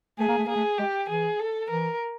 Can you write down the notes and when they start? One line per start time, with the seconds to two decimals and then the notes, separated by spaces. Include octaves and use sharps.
0.19 A3 G#4
0.28 A#3
0.38 A3
0.47 A#3 G#4
0.56 A3
0.79 G#3 G4
1.09 E3 G#4
1.40 A4
1.70 E3 A#4